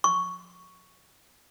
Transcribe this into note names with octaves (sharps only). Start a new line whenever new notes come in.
C#6